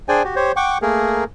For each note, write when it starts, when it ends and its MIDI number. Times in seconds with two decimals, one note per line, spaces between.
0.09 0.23 62
0.09 0.23 68
0.09 0.23 72
0.09 0.23 74
0.09 0.23 79
0.09 0.23 80
0.24 0.35 66
0.24 0.35 67
0.36 0.52 67
0.36 0.52 72
0.36 0.52 73
0.56 0.78 78
0.56 0.78 79
0.56 0.78 85
0.56 0.78 86
0.82 1.24 57
0.82 1.24 58
0.82 1.24 68
0.82 1.24 70